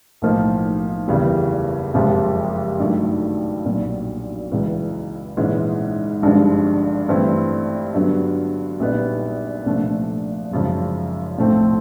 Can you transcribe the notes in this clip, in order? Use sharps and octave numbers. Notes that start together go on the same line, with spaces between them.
B1 A2 F3 A#3 D#4
F#1 E2 C#3 E3 G3
F#1 F2 C3 F3 G#3
G2 D#3 F#3 A3
B1 A#2 F#3
C#2 C#3 E3
A#1 G#2 E3 G#3 C#4
G#1 G2 D3 F3 G#3
G2 E3 A3 C4 E4
G2 D3 F#3 B3
A#1 A#2 G3 B3 D#4
C2 A#2 F3 A3 D4
G#1 F#2 C#3 F3
B1 A2 F3 A3 C4